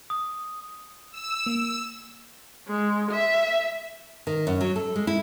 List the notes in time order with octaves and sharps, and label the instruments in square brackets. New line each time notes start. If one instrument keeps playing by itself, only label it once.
[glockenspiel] D#6
[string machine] E6
[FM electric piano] A#3
[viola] G#3
E5
[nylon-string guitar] D#3
F#2
F#3
A4
G#3
E4